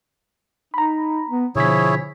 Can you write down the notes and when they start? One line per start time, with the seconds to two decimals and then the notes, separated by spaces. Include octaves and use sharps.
0.74 D#4 A#5 B5
1.29 B3
1.56 B2 D3 F3 E4 G#4 C#5 B6